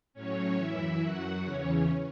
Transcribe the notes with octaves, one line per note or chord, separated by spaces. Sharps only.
A2 F#3 C#4 C#5
F#2 E3 E4 E5
F#2 F#3 F#4 F#5
E2 C#3 E3 C#4 C#5